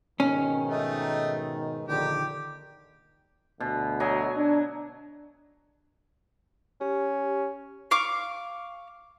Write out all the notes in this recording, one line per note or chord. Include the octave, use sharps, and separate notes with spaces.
G#2 B2 D#3 C#4
A3 D#4
A#1 D3 D#3 G4 G5
D2 B2
F#3 D#5 G#5
D4
C#4 G4
F5 C#6 D6